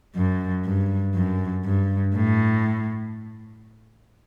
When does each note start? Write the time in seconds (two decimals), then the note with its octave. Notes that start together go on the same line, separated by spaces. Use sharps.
0.16 F#2
0.65 G2
1.15 F#2
1.65 G2
2.15 A2